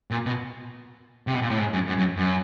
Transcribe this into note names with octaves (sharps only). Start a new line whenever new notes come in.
A#2
B2
C3
B2
A#2
A2
G#2
F#2
F#2
F#2
F#2